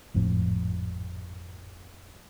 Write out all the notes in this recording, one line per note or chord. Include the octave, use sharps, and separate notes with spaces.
G#1 F2 A2 F3